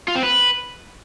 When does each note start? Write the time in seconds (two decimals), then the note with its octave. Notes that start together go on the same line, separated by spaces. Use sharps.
0.08 F4
0.16 C4
0.23 B4